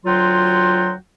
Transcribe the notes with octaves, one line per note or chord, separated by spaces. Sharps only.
D2 F#3 F4 F#4 G5 C6